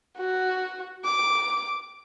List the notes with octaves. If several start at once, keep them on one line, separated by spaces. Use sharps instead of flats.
F#4
D6